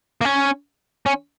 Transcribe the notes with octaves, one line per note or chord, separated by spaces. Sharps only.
A#3
C#4
C#4